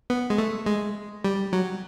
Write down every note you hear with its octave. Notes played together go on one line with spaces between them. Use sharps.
B3
G#3
A3
G#3
G3
F#3